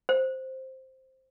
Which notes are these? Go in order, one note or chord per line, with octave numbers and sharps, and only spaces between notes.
C5